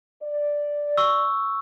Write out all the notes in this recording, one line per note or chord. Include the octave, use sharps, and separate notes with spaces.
D5
C#6 E6